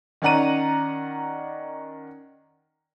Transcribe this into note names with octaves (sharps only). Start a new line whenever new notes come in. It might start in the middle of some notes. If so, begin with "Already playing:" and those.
D#3 C#4 D5 F#5 A#5 D#7